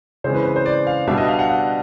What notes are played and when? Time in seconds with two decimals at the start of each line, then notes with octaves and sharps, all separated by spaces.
0.24 C#3 E3 G#3 C4 C5
0.34 B4
0.45 B4
0.56 C5
0.66 D5
0.87 F5
1.07 B2 G3 B3 D4 E5
1.18 D#5
1.28 F5
1.39 F#5
1.49 F5